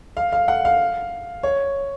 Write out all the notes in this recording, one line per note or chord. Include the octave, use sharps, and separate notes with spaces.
F5
F5
F#5
F5
C#5